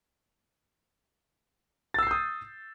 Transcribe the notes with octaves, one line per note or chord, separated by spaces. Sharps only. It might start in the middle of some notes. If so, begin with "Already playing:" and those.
D#6 E6 G6 A6 C7